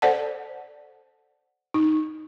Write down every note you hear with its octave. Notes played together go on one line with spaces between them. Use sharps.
A4 C5 D5 F#5 A5
D#4